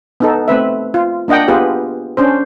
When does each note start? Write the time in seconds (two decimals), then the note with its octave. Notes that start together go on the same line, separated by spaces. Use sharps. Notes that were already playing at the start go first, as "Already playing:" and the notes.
0.20 B3 D#4 A4
0.48 A3 C4 B4 E5
0.94 F4
1.28 A#3 D4 D#5 F#5 G5
1.48 B3 F4 G4 G#4 B4
2.17 C#4 D4 C5